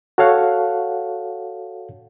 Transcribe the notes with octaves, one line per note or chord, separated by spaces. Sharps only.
F#4 A4 C#5 F5 F#5